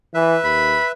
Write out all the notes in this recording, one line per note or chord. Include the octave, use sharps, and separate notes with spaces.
E3 B4 E5
D#2 B5